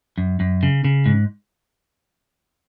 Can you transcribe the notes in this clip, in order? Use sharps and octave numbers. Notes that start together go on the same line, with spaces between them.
F#2
F#2
C#3
C#3
G#2